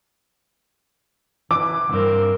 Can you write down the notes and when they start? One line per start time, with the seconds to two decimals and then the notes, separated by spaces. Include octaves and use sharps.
1.51 E3 D6
1.89 C#2 G2 C4 A#4